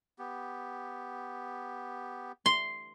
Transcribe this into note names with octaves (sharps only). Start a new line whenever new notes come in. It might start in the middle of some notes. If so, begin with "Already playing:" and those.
B3 G4
C6